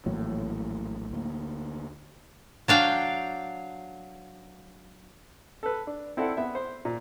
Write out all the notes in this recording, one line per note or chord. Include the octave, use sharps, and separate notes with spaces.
A#1 A2 E3 F#3 A#3
D2 A#3
F#3 D4 F5 G5
A4 B4
D4
C4 E4 A4 D5 F#5
B3 E5
C5
A#2